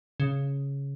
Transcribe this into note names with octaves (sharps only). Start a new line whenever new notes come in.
C#3